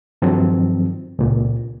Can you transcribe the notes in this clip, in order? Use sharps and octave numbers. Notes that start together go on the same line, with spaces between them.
G2 D#3 F3 F#3 C4
C#2 A#2